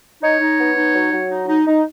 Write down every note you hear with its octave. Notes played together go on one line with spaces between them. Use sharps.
D#4 C#5
D#4
B3
D#4
F#3
F#3
D#4
D#4
D#4